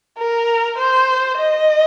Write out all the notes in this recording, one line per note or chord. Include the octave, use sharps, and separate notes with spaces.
A#4
C5
D#5